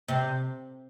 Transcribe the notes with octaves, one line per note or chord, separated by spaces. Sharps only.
C3